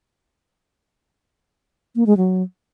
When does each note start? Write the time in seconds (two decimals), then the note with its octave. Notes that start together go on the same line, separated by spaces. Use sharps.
1.96 A#3
2.06 G#3
2.17 F#3